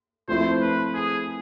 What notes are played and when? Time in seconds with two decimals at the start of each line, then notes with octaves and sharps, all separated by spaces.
0.28 F3 A3 C4 E4 C5
0.61 B4
0.94 G#4